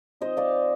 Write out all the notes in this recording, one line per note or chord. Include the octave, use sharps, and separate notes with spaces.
F3 C4 D#4 C5 D#5
D5 F5